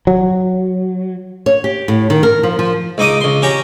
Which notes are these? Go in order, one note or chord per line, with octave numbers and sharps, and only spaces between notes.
F#3
C#5
G4
A2
D#3
A#4
F3
F3
C#2 D#4 D6 D#6
C#2 C6
C#4 G4 A#5